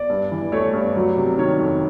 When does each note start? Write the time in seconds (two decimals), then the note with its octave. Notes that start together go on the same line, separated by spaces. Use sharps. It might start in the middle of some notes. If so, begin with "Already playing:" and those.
Already playing: D5
0.10 G2
0.31 E3
0.52 A3 C#5
0.73 G2
0.96 F#3
1.17 C3
1.38 D#3 C#5
1.60 F2